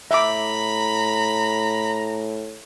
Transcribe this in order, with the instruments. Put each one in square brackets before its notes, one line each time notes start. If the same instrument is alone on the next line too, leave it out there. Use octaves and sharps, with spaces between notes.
[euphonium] A2 [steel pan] E5 D6 [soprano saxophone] A#5 [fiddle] B5